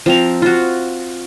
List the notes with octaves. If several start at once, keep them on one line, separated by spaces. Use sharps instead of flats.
F3 C4 A#5
F4 F#4